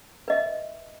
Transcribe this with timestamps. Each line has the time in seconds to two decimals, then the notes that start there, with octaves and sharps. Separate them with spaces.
0.28 B4 D#5 E5